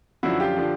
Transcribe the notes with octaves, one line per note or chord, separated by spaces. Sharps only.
F#2 D3 F3 E4 F#4
F4 G4
D3 F3